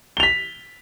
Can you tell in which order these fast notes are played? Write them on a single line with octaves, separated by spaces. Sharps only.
G7 F7 B6